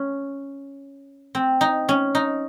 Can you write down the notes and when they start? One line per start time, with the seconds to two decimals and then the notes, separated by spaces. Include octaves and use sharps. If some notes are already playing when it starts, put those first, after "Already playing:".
Already playing: C#4
1.35 C4
1.61 D#4
1.89 C#4
2.15 D#4